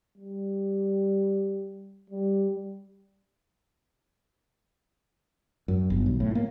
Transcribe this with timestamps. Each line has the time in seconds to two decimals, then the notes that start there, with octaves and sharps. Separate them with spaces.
0.18 G3
2.10 G3
5.68 F#2
5.90 G1
6.06 B1
6.20 A2
6.35 A#3